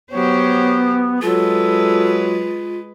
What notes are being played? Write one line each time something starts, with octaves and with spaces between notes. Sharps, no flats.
F#3 B3 G4 C5 C#5
F#3 G#3 F4 A4 B4